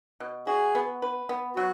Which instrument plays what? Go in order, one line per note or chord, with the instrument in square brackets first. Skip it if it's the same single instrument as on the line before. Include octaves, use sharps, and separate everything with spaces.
[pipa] B2
[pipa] F#4 [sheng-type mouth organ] G#4
[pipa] B3
B4
B3
[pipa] F#3 [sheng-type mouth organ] F#4